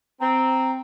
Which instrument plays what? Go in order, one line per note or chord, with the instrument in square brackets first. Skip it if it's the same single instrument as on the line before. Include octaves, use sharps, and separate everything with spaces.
[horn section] C4 [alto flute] A#5